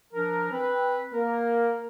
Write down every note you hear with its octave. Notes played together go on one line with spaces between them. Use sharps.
F3 D4 A#4
C4 B4
A#3 A#4